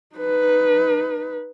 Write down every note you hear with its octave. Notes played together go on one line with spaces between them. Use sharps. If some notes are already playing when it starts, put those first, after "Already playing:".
D#4 B4